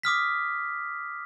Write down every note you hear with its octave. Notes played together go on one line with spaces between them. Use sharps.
D6 D#6 F6 B6